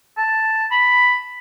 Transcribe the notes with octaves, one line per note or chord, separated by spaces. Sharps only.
A5
B5